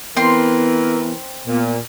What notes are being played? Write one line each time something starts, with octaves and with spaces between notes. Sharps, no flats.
E3 B3 C4 A#4 C6
A#2 B3